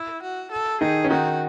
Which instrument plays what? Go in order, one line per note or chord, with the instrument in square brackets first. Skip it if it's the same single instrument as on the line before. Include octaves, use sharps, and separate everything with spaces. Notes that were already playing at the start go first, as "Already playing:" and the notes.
Already playing: [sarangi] E4
F#4
A4
[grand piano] D#3 D#4 [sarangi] G#4
[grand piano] C#4
[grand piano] D#3 D#4 [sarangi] F#4